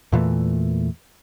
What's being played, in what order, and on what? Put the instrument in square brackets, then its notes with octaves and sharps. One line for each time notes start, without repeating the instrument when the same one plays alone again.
[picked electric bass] E2 A#2 E3 A3